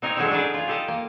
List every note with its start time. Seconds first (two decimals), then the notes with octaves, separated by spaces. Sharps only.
0.02 C4 D#4 A#4 C#5
0.16 D3 F#3 G#3 C#4 D#4 E4
0.31 D4 D#4 G#4 B4 D5
0.54 F4 G#4
0.68 G4 A4 D#5
0.88 A#3